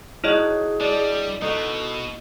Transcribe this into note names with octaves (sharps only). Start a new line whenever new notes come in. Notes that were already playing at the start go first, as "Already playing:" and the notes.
D#4 E4 F#4 G#4 C#5 D#5 G5
G3 D4
B2 D#4 F#4 A4